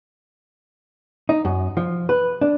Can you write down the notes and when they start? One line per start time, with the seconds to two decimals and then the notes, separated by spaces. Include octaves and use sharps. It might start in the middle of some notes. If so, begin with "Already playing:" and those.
1.29 D#4
1.45 F#2
1.77 F3
2.09 B4
2.41 D4